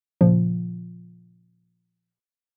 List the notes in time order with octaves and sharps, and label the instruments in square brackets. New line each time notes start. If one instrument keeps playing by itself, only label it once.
[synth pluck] A#2 C#3 F3